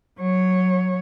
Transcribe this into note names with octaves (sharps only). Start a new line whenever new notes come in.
F#3 C#5